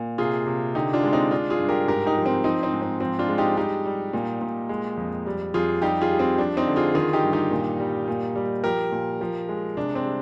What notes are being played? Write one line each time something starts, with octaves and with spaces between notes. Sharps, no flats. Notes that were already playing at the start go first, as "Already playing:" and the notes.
Already playing: A#2
C3 F4 G#4
C3
D3 D#4 G4
D4 F4
G#3
C4 D#4
G#3 D4 F4
F4 G#4
G2
G4 A#4
G#2 G4 A#4
D#4 G4
F3
C4 D#4
F3 C4 D#4
C4 D#4
G#2
C4
F3 C4
D4 F4
G#3
D#4 G4
G3 D#4 G4
G3
A#2
A#2
G#3
F2
G3
F2 F4 G#4
G3 D#4 G4
F4 G#4
G3
C4
F3 D4
C4 D#4
D3
F4 G#4
D#3 F4 G#4
D#4 G4
G2
D#4 G4
A#2
G3
A#2
G3
F3 G4 A#4
A#2
F3
G#3
C3 D4
C4
G3